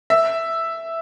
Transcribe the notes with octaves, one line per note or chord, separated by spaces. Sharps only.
E5